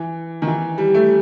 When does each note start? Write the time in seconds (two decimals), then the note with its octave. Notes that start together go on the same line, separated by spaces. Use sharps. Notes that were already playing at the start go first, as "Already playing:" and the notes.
Already playing: E3
0.42 D#3
0.47 E3
0.78 G3
0.94 A3